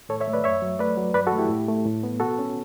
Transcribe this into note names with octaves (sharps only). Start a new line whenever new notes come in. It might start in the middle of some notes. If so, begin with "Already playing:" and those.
A2 A4 C#5
C#5 E5
A3
B4 D5
F#2 C#5 E5
F#3
A3 B4 D5
F#3
G2 B4 D5
F#4 A4
A3
E4 G4
A2
A3
A2
B3
B2 F#4 A4
C#4